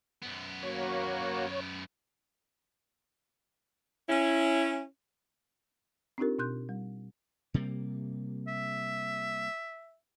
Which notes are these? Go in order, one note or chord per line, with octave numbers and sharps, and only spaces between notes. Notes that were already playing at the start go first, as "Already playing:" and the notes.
F#2 B3
A#3 F#4 C#5
C#4 E4
C4 D4 D#4 F4 G4 A#4
B2 C6 F#6 G6
G3
C3 G3 A#3
E5